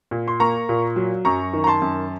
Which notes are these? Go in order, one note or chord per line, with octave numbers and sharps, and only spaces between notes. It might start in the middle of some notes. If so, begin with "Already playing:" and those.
A#2
C6
A#3 A#5 C#6
A#2
F#3
F#2 A#5 C#6
D#3
A#5
A5 C6
F#2